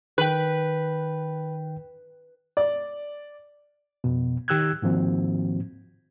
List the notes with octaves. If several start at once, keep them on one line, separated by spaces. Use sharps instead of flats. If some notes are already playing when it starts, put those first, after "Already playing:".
D#3 B4 G5
D5
F2 B2
D#3 G4 E6 F#6 G#6
G#2 D#3 F3 A#3 C4 F#4